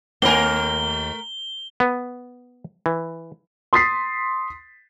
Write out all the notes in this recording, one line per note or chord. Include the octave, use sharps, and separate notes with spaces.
D#2 A3 A#4 G#5 G7
B3
E3
C6 D#6 A6 B6 C7